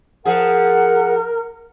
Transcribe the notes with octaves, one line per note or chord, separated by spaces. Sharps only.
F3 G#4 A#4 F#5